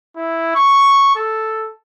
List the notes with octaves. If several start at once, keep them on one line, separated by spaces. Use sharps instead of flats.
E4
C#6
A4